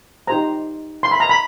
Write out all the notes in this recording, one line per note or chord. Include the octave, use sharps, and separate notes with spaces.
D#4 G4 C5 A#5
C6
B5
A#5
B5